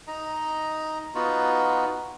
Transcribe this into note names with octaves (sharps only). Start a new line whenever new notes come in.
D#4 D#5 A#5
B3 D#4 F4 F#4